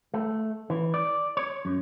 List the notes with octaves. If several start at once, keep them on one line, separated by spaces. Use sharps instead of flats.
A3
E3
D5
C#5
F#2